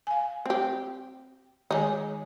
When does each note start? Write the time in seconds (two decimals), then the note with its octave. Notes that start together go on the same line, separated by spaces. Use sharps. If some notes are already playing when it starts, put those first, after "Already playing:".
0.07 F5 G#5
0.46 C4 G4
1.71 D#3 G#3 D#4 C#5 G#5